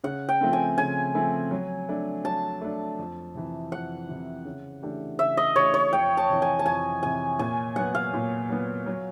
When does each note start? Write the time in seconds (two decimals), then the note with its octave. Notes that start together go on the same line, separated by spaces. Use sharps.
0.04 C#3 F#5
0.29 G5
0.41 F3 A3 C4
0.53 G#5
0.78 C#3 G#5
1.15 F3 A3 C4
1.51 F#3
1.89 A3 D4
2.25 F#3 A5
2.61 A3 D4
2.99 F2
3.35 C3 E3
3.72 F2 F#5
4.09 C3 E3
4.45 C#3
4.83 E3 A3 D4 G4
5.19 C#3 E5
5.37 D#5
5.56 E3 A3 D4 G4 C#5
5.74 C#5
5.93 F2 G5
6.17 A5
6.29 C3 E3
6.42 G#5
6.59 A5
6.66 F2 G#5
7.03 C3 E3 G#5
7.39 A#2 G#5
7.76 F#3 B3 F#5
7.95 F5
8.14 A#2
8.49 F#3 B3
8.86 F#3